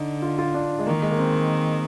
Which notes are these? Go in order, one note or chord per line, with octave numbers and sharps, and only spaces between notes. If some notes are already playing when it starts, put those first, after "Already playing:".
Already playing: D3 D#4
F4
F4
D4
G#3
D#3 A#3
G#3
A#3
C4